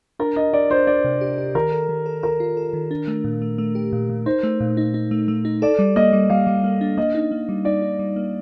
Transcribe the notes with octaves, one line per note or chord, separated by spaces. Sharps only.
D4 A#4
D4 D#5
D4 D5
D4 C5
D4 D5
C3
G4
G4
D#3 A#4
A4
D#3
A4
A4 A#4
F4
A4
D#3
D4
A3
A#2
A3
A3
G4
A#2
A#2
D#4 C5
A3
A#2
D#4
D#4
A3
A3
D#4
A4 D5
G3
A#3 D#5
G3
G3 F5
G3
A#3
D4
A#3 D#5
D#4
A#3
G3
D#4 D5
D#4
G3
A#3